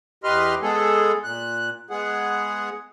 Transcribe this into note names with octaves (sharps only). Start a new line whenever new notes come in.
E2 G4 B4 D#5 C6 F6
G#3 B3 G#4 A4
A#2 F#6
G#3 B3 G#4 F#5